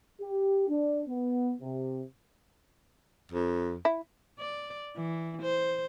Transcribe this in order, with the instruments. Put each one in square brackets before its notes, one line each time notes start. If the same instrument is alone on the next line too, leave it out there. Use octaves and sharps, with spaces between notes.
[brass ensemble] G4
D4
B3
C3
[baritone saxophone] F2
[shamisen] E4
[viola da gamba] D5
E3
C5